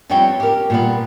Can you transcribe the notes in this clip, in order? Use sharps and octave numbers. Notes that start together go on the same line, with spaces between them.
F2 G3 B3 C4 C#5 G5
G4 A#4
A#2 G3 B3